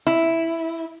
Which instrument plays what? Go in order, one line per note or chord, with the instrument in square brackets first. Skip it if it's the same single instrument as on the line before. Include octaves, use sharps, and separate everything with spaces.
[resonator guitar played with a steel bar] E4